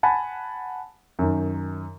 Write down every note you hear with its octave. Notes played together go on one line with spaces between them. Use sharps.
F#5 G#5 A5 B5
F#2 D#3